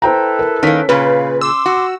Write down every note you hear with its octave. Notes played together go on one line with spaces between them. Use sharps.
E4 A4 B4 C5 G5 A#5
A#4
D#3 A#3 C#4 B6
A#2 C#3 B4 F5
C6 D6 E6
F#4